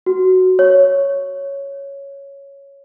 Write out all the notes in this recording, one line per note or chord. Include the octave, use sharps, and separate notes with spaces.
F#4
C#5